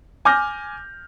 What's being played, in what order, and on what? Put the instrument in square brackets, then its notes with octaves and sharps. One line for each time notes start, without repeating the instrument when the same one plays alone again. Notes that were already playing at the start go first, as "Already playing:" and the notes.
[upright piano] G#5 D6 F6 G6 A#6